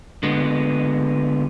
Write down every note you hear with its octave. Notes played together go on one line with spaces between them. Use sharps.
D3 G#3 B3